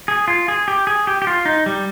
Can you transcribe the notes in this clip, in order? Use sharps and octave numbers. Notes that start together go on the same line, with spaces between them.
G#4
F4
G#4
G4
G#4
G4
G4
F4
D#4
G3